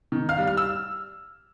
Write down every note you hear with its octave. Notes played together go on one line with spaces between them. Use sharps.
D#3
F5 F6
G3
F6
E6